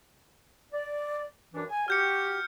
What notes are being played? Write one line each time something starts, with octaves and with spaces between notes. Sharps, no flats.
D5
F#2 E3 D4
G#5
F#4 G4 F6 G6 C#7